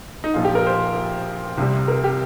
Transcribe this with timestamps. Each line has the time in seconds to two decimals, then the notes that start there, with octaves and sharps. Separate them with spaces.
0.24 D#4
0.34 A#1 A#2 F3 F4
0.45 G4
0.55 A#4
0.67 C5
1.58 C2 C3 G3
1.88 A#4
2.04 G4